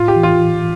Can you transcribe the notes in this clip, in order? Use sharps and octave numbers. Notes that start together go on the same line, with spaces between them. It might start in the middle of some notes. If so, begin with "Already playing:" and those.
Already playing: A2 F4
G4
E3
F4